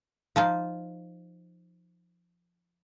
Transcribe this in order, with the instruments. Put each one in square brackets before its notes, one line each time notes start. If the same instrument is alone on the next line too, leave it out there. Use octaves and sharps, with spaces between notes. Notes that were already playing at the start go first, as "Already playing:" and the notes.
[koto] F3 D#4 F4